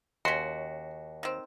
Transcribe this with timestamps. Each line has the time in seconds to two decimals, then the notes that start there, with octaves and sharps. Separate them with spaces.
0.25 D#2 C#4 F#4 C6
1.23 D#3 C4